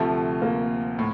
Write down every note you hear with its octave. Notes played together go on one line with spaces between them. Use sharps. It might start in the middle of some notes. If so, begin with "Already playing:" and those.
Already playing: D2 C3 F3 A3
A#3
A2